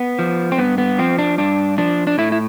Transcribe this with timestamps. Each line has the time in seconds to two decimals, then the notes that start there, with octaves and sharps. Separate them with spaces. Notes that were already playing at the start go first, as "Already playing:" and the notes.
Already playing: B3
0.19 F3
0.52 C4
0.58 G2 B3
0.78 B3
0.99 F3 C4
1.19 D4
1.38 G2 D4
1.78 F3 D4
2.07 D4
2.18 A2 E4
2.32 E4